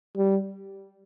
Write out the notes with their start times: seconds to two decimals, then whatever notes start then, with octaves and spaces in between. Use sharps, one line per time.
0.17 G3